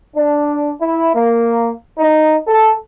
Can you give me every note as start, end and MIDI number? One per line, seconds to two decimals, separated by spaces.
0.15 0.70 62
0.80 1.10 64
1.14 1.70 58
1.98 2.36 63
2.47 2.73 69